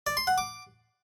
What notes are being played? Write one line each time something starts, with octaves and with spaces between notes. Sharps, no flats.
D5
C6
F#5
D6